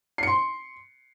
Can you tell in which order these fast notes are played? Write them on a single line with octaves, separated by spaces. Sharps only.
C7 C#7 C6